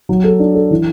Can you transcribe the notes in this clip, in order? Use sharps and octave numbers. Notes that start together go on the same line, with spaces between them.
F#3
A4
D4
A4
E3